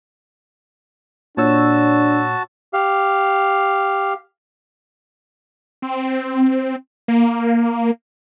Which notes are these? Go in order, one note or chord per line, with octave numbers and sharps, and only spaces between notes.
A#2 D4 F#4 C#5 A5 E6
G4 F5
C4
A#3